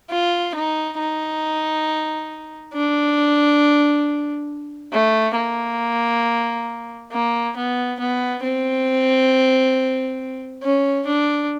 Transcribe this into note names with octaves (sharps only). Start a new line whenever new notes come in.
F4
D#4
D#4
D4
A3
A#3
A#3
B3
B3
C4
C#4
D4